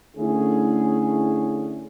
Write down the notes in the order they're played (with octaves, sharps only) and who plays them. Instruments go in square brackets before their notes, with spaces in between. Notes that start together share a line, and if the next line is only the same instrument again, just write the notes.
[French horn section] D3 A3 C#4 E4 G#4